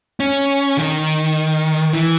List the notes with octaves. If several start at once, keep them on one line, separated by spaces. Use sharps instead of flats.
C#4
D#3
E3